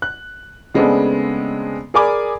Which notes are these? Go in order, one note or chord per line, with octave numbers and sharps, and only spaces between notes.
F#6
C#3 G#3 A3 B3 C4 D4
G#4 A#4 D5 G#5 B5 D6